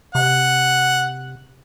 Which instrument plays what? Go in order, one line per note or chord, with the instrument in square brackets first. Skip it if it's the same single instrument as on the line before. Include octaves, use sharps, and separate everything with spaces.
[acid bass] C3 [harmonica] F#5